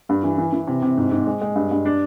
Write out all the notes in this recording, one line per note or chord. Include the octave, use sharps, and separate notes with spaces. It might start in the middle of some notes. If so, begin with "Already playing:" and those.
G2
E3
E3
E3
C3
C3
G#2
G#2
G#3
G#3
G2
G2
D4